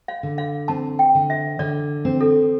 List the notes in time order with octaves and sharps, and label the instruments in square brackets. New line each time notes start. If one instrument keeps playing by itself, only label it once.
[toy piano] F5
[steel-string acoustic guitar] D3
[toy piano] F5
[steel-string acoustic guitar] C4 [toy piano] A5
[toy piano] G5
[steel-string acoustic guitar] D3
[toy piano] E5
[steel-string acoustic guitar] D3 [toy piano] D5
[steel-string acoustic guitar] C4
[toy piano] A4